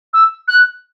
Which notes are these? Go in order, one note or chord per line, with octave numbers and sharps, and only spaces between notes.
E6
F#6